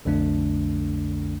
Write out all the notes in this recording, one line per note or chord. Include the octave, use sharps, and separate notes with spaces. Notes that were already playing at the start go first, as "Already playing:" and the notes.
B1 F2 D3 A3 D4